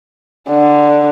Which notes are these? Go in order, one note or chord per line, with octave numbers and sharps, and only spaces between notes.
D3